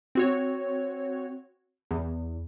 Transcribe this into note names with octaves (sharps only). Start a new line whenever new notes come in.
C4 F#4 C#5
E2